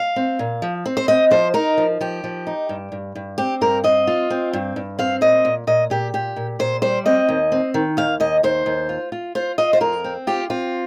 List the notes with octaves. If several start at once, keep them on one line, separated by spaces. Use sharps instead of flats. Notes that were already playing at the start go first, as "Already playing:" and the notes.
Already playing: F5
C4
A#2
F3
C4
C5
C4 D#5
F3 C5
D#4 A#4
F3
F3 G4
F3
D#4
G2
G2
G2
C4 G4
G2 A#4
C4 D#5
F4
C4
G2
G2
C4 F5
A#2 D#5
A#2
A#2 D#5
A#2 G4
A#2 G4
A#2
A#2 C5
G3 C5
C4 D#5
D#2
C4
D#3
D#2 F5
D#2 D#5
D#2 C5
D#2
F4
F4
F4 C5
F4 D#5
C5
F2 A#4
C4
F4 G4
C4 F4